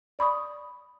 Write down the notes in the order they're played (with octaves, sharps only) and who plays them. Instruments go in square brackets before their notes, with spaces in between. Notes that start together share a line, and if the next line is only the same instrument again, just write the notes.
[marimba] D5 B5 C#6 D#6